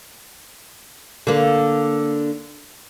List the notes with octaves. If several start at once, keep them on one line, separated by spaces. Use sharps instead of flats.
D3 A#3